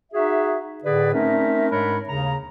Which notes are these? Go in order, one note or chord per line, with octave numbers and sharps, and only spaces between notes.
D#4 F#4 G#4 E5
A2 D3 G#4 B4 D5
A3 C4 C#4 D#4 A#4 E5
G#2 G#3 D4 A#4 C#5 B5
D#2 C#3 A#5